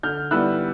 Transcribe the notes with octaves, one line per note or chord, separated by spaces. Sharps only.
D3 F6 G6
G3 B3 E4 E6 F#6